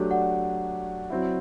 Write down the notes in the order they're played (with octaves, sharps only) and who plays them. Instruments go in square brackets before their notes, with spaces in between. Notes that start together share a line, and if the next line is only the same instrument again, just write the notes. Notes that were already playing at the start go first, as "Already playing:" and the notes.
Already playing: [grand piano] F#3 A3 D4 G4
[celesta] D5 F#5
[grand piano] F#3 C4 E4